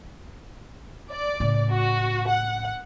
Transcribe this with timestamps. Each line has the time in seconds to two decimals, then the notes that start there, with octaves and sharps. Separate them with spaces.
1.11 D5
1.40 A2 C#3
1.70 F#4
2.28 F#5